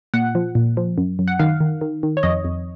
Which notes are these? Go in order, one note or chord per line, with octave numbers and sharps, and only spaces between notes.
A#2 F#5
F3
A#2
F3
F#2
F#2
F#5
D#3 F5
D#3
D#3
D#3
C#5
F2 D#5
F2